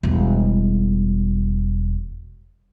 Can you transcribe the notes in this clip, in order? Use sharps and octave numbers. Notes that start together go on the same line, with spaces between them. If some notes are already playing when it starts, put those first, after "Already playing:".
E1 G3